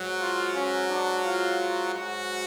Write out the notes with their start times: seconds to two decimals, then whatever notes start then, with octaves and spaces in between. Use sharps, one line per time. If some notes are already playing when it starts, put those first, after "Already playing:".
Already playing: G#2 F#3
0.19 F4
0.55 C#4
0.89 D4
1.24 F4
1.59 F4
1.94 G#2 F#3 F#4